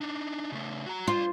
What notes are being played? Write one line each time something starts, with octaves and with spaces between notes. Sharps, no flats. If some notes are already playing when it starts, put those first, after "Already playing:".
D4 D#4
C#3 A3
F#4 A#5
F4 C5 D5